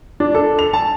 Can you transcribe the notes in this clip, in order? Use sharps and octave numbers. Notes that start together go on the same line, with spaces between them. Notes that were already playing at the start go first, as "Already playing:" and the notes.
D4
A4
F7
A5